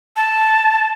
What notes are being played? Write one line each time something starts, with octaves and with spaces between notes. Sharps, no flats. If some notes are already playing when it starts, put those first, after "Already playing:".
A5